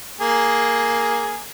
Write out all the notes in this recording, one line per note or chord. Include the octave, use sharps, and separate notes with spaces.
A#3 G#4